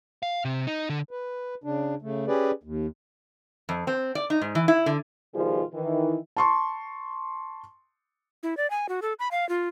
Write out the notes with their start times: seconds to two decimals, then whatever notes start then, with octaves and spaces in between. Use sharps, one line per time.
0.23 F5
0.45 C3
0.67 D#4
0.90 D3
1.11 B4
1.64 C#3 D4
2.02 C#3 A3
2.28 C#4 G4 G#4 B4 D5
2.63 D#2
3.69 F2
3.87 C4
4.15 D5
4.30 D#4
4.41 G#2
4.55 E3
4.68 E4
4.86 D3
5.35 B2 D#3 F3 G3 F4 G#4
5.74 D#3 E3 E4
6.37 A5 C6 C#6
8.43 E4
8.57 D5
8.70 G#5
8.89 F#4
9.02 A4
9.19 B5
9.31 F5
9.49 F4